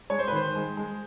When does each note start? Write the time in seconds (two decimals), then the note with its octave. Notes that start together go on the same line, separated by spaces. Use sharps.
0.10 G#3 C#5
0.19 C5
0.28 B4
0.32 D#3 C5
0.55 G#3
0.77 G#3